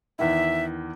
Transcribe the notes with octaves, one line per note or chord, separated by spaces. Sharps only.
E2 D#3 E4 E5